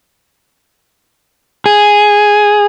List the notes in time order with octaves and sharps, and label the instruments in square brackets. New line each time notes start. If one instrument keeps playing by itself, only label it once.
[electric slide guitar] G#4